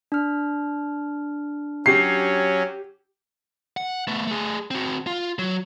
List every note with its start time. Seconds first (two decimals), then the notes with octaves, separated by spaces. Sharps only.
0.12 D4 F6
1.86 F#3 C#4 G4 C7
3.77 F#5
4.07 A3 B3
4.27 A3 G#4
4.71 C4 F#4
5.07 F4
5.39 F#3